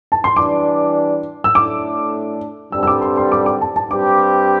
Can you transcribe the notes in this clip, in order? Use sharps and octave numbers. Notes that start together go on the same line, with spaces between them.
A5
C6
E3 G3 D4 D6
E6
A2 A3 D4 D6
G2 D3 G3 C4 A4 E6
E6
D6
C6
C6
D6
D6
A5
A5
G2 G3 C4 G4 D6